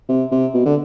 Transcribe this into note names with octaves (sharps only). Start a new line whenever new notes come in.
C3
C3
B2
D3